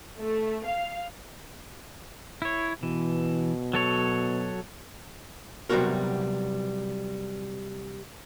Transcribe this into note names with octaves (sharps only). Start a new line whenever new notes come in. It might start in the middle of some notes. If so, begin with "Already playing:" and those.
A3
F5
E4 C#5
B2 E3
F#3 A4 C#5
C3 F#3 G3 B3 F#4 A#4